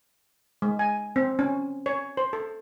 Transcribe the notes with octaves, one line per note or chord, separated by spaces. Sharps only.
G#3
G#5
C4
C#4
C#5
C5
A4